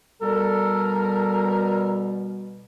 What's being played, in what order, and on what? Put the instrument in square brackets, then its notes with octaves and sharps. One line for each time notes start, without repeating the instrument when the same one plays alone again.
[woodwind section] B2 G3 [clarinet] A4 [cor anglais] A#4